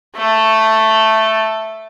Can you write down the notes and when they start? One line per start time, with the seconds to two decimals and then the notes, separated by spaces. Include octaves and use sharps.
0.16 A3 A4